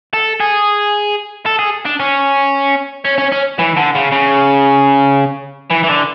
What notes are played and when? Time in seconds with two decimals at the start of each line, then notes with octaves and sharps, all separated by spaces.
0.14 A4
0.40 G#4
1.46 A4
1.59 G#4
1.86 D4
2.00 C#4
3.05 C#4
3.18 C#4
3.32 C#4
3.59 E3
3.76 D3
3.95 C#3
4.12 C#3
5.71 E3
5.84 E3
5.89 D3